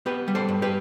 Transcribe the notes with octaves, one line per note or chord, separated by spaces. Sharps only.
B3 G4 B4
G3
A4 C5
G2
G4 B4